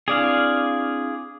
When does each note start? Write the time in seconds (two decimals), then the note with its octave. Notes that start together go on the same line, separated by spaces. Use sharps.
0.08 C4 D4 E4 G#4 D5 F5